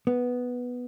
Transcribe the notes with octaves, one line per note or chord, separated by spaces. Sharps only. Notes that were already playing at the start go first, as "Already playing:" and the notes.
B3